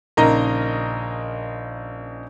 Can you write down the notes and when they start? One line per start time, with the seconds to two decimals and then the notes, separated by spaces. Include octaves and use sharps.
0.17 A#1 C#3 D#4 A#4 D#5 A#5